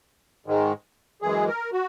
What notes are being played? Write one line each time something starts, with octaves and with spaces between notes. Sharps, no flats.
G#2 D#3 G#3
F#2 E3 G#3 G#4
A#4
F#4